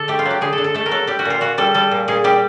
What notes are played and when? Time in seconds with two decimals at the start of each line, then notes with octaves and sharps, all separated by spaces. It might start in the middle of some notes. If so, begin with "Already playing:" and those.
Already playing: D3 A4
0.08 A3 G4
0.19 F4
0.26 F#3 G4
0.41 D3 G#4
0.53 A4
0.58 D3
0.64 A4
0.75 A3 A4
0.86 A#4
0.91 F#3 A4
1.07 G3 G4
1.19 F#4
1.25 A#2 F4
1.41 A#2 F#4
1.58 G3 A4
1.74 G3 A4
1.91 A#2
2.08 A#2 G#4
2.24 G3 G4